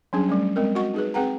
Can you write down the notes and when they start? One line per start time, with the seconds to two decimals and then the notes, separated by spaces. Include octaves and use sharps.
0.13 F#3 G3 C#4 D4 G#4
0.29 G3 A3 C#4
0.56 G#3 C4 A#4
0.75 F#4 D#5 F#5 C#6
0.94 D#4 G#4 B4
1.14 C4 G#4 B4 F#5 G5 A#5